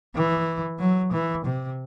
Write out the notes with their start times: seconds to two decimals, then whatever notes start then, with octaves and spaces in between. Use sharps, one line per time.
0.15 E3
0.79 F#3
1.12 E3
1.45 C3